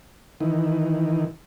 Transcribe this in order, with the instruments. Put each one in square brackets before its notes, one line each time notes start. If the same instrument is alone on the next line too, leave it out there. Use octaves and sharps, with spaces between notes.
[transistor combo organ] D#3 E3